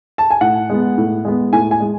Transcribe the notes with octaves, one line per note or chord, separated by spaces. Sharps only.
A5
G#5
A2 F#5
G#3 B3
A2
G#3 B3
A2 G#5
G#5
G#3